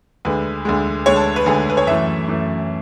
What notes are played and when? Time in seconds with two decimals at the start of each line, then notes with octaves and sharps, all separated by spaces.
0.25 D2 D3 G#3 B4
0.65 D2 D3 G#3
1.06 D2 D3 G#3 C#5
1.16 A5
1.36 B4
1.46 D2 D3 G#3 G#4
1.70 B4
1.77 C#5
1.87 F#2 E3 A3 E5
2.28 F#2 E3 A3